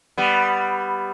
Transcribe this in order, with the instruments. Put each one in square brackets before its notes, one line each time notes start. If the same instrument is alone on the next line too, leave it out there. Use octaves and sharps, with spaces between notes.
[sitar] G3 B3